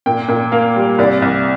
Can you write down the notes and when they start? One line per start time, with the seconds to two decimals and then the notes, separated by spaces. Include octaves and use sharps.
0.06 A#2 G5
0.28 A#2
0.52 A#3 F5
0.76 G3
0.98 C2 D5
1.22 C2